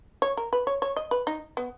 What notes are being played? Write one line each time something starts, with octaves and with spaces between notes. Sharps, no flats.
C#5
A#4
B4
C#5
C#5
D#5
B4
D#4
B3